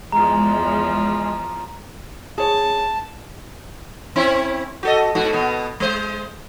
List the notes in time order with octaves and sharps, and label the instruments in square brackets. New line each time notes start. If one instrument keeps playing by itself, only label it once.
[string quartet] E2 F3 [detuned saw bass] G#3 [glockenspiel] A#5
[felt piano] G#4 C#5 [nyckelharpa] A5
[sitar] C4 C#4 E4
F#4 A4 D#5
G#2 B2 F#4
B2 B3
G#3 C5